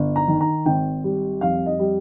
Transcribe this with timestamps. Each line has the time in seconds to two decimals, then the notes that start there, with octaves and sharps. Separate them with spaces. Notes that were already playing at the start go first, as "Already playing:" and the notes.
Already playing: G1
0.16 A#5
0.28 D#3
0.41 A#5
0.66 G#1 G5
1.04 G3
1.41 F2 F5
1.66 D#5
1.79 G3